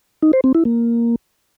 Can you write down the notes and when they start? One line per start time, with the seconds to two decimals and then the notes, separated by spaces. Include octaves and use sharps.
0.22 D#4
0.33 C5
0.44 C4
0.55 E4
0.65 A#3